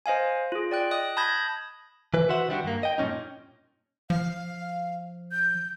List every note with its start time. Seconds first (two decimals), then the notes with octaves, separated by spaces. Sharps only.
0.06 C5 D#5 F5 G#5
0.52 F4 G#4
0.71 D5 G5 F#6
0.91 D#5 D#6 F#6
1.17 A5 B5 D#6 G6 G#6 A#6
2.14 E3 B4
2.29 F#4 B4 C5 E5 F#5
2.48 D#3 G3 D4 F#4
2.64 G2 A#3
2.83 D#5 G5
2.98 G2 A#2 A#3 C#4 D#4
4.10 F3 F5
5.32 G6